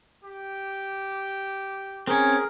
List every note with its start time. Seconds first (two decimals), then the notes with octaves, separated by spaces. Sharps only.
0.24 G4
2.07 C4 C#4 G#4 A#4